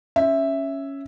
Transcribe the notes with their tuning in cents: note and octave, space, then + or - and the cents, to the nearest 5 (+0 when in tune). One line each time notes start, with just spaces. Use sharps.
C#4 +0 E5 +0